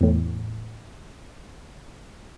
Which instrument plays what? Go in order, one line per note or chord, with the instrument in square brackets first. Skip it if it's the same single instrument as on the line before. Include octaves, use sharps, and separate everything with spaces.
[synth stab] E2 A2